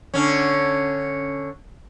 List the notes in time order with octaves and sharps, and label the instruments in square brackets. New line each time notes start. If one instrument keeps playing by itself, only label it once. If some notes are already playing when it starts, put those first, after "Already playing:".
[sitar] D3 C#4